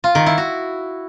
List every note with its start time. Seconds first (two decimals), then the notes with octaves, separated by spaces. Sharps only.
0.04 F4
0.15 D#3
0.26 E4
0.38 F#4